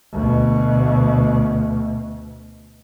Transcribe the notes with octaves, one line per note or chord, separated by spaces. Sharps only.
D2 B2